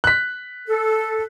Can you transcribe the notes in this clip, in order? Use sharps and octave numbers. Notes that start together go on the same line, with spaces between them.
F#6 B6
A4